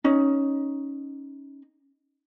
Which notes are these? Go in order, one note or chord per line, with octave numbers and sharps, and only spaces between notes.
C#4 D#4